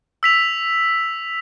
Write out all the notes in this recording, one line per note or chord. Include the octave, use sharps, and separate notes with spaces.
E6 B6 F7